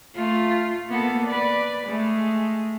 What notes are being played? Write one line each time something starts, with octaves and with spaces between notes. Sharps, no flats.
A3 F4
A#3 B3 A4
B4 D5
G#3 A3